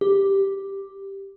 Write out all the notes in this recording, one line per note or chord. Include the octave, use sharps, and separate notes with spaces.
G4